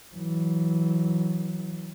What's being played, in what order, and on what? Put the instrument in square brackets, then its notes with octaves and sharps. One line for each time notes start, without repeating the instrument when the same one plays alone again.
[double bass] E3 F#3